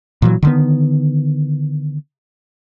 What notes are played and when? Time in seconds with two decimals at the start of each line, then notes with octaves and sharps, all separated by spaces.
0.22 A#2 E3 F#3
0.43 D3 D#3 B3